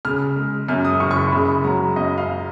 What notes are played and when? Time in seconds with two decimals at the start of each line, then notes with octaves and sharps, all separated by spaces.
0.05 C#3 F6
0.36 G#3
0.68 F#2 F6
0.85 D#6
1.00 F#1 C#6
1.11 C#6
1.16 B5
1.32 C#3 B5
1.64 F#3 A#5
1.96 F#2 D#5
2.18 F5